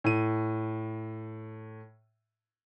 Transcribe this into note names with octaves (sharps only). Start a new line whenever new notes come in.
A2 D#7